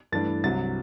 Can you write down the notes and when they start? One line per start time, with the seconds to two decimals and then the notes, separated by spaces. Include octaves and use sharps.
0.12 G2 E3 A3 D4 A6
0.44 C2 C3 F#3 A6